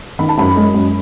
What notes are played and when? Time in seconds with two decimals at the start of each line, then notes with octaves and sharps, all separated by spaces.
0.19 D#3 B5
0.29 A5
0.38 F#2 B5
0.56 G#3
0.74 F#2